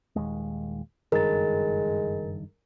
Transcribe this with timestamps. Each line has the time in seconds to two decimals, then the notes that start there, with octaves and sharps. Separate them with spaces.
0.16 D#1 D#2 G#3
1.12 F#1 G2 D#3 G#3 A#4 A6